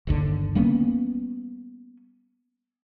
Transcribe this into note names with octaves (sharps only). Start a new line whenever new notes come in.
G1 D#2 D3
G3 A#3 B3 C#4